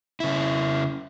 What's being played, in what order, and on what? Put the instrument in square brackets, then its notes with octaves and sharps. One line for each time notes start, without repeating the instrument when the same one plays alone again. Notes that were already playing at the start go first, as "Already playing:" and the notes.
[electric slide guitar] C#3 E4